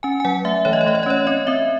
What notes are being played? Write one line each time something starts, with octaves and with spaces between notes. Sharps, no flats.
C#4 G#5
G#5
F#3 F#5
A3 E5
E3 C#5
D#5
C#5
A3 D#5
C#5
D#5
C#4 C#5
C4 D#5
C4 E5